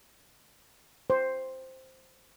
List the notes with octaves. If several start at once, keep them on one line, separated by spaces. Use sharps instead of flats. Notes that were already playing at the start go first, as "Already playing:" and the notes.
C5